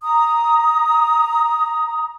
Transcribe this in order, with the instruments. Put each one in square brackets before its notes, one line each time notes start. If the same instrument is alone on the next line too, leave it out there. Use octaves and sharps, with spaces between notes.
[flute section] A#5 D#6